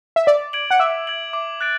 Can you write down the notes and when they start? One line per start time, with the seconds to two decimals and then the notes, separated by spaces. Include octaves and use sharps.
0.16 E5
0.27 D5 D6
0.53 G#6 D7 F#7
0.71 F#5
0.80 E5 D6
1.07 G#6 D7 F#7
1.33 D6
1.61 F#6 A6 D7